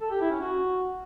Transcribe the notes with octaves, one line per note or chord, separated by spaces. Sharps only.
A4
G4
E4
C#4
F#4